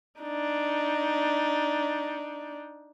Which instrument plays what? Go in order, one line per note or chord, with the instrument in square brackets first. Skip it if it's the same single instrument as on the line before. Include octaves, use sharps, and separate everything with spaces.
[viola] D4 D#4